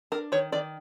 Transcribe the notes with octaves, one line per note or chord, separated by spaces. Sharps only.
D4 A#4
D#3 C#5
D#3 D5